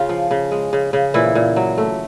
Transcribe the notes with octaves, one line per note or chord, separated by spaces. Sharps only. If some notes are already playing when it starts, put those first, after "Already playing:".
Already playing: C#3 F4
F3
C#3
G#3
C#3
C#3
A#2 E3 E4
A#2
F#3
A3